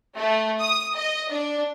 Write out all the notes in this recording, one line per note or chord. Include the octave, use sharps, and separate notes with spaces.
A3
D#6
D#5
D4